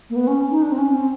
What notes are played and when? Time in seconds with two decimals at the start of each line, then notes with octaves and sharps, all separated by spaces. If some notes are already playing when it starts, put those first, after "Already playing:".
0.10 A#3
0.16 B3
0.27 C#4
0.51 D#4
0.63 D4
0.72 C4
0.78 C#4
0.94 C4